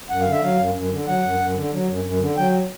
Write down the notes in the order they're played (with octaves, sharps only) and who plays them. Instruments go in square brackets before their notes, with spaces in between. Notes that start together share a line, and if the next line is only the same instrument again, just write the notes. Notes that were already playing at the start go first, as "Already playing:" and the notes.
[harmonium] F#2 F#5
F5
D3
E5
F#3 F5
F#2
F#2
D3
F#3 F#5
F#2
F#2
D3
F#3
F#2
F#2
D3
F#3 G5